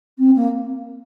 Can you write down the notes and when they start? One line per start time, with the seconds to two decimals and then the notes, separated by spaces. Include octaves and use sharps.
0.18 C4
0.36 A#3